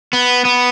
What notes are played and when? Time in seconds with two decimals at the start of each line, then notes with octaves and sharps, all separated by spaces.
0.13 B3
0.45 B3